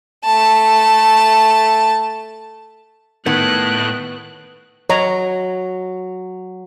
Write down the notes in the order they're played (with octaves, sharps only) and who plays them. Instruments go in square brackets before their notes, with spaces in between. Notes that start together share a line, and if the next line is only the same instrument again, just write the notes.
[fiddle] A3 A5
[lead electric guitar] A2 A3 [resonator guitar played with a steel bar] D#3 [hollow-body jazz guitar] B3 [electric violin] F#6
[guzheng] F#3 [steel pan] C#5 D#5 A#5